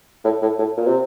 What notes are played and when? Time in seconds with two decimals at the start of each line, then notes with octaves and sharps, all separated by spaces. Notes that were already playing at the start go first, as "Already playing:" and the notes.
0.25 A2
0.42 A2
0.59 A2
0.78 A#2
0.87 C3